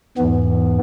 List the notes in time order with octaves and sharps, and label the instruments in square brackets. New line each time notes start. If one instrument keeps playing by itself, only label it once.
[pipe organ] E2 G#2 E3 B3